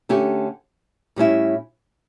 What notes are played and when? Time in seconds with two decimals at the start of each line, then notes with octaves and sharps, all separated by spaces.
0.09 D3 A3 C#4 G4
1.16 A2 G3 C#4 E4